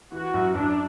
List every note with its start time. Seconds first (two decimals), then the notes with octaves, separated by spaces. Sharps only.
0.12 E3 F#4
0.34 F#2
0.55 F#2 D4